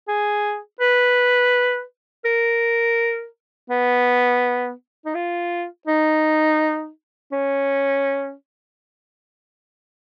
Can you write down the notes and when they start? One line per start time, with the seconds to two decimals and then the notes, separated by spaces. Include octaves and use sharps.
0.08 G#4
0.81 B4
2.25 A#4
3.70 B3
5.06 D#4
5.15 F4
5.87 D#4
7.32 C#4